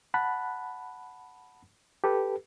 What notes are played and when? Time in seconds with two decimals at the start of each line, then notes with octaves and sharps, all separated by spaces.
0.14 F#5 A5 B5 F#6
2.04 G4 A4 B4